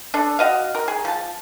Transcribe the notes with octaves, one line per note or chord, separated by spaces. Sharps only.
D4 A4
F#4 D#5 F5
A#4
G#4
F3 A5